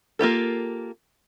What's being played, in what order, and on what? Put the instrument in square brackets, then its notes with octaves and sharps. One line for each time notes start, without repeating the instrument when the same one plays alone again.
[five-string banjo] A#3 F4 G4 A4